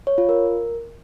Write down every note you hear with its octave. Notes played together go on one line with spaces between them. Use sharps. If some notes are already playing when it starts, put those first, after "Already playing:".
C#5
F4
A#4